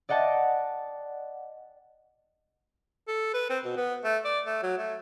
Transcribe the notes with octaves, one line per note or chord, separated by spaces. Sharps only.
D5 D#5 F#5 G5 A5
A4
B4
C4
B2
B3
A3
D5
A3
F#3
A3